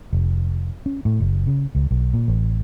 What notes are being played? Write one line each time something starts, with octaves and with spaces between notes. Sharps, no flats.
F1
C#4
A2
F#1
C#3
C#2
B1
A#2
A1